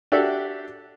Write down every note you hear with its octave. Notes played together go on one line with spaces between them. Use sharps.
D4 F#4 G4 A4 D5 E5